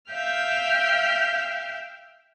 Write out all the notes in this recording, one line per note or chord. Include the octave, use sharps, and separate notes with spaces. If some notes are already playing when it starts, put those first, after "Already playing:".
E5 F5 G5 F6 G6